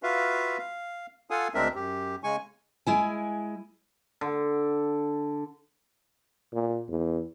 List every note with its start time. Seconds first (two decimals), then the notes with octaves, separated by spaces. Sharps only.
0.03 F4 F#4 B4 E5 F5
0.58 F5
1.30 F4 A4 F5 F#5 G#5 D#6
1.54 D2 G#3 C4 D4 A#4 E5
1.75 F#2 G4
2.23 C#3 G#3 G#5 C#6
2.87 G#3 E4 G#5
4.21 D3
6.53 A#2
6.88 E2